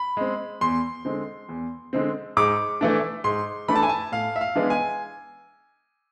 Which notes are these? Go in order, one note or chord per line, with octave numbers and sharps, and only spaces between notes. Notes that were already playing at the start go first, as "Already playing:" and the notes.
Already playing: B5
G#3 C4
E2 C6
D3 G#3 C4
E2
D3 G#3 C4
G#2 D6
E3 A3 D4
G#2 C6
E3 A3 D4 B5
A5
G#5
A5
A2 F5
E5
F5
E3 G#3 B3 D4
G#5